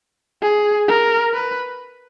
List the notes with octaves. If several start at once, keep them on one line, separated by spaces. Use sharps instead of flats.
G#4
A#4
B4